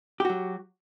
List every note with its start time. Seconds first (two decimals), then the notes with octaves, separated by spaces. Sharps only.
0.20 G4
0.25 F#4
0.30 F#3